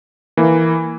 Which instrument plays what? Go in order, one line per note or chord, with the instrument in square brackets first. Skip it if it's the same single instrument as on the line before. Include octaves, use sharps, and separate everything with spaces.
[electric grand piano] E3 A#3